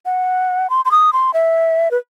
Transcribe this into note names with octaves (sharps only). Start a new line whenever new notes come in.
F#5
C6
C6
D#6
C6
E5
B4